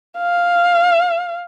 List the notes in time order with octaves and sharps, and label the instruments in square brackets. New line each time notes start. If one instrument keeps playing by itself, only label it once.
[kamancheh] F5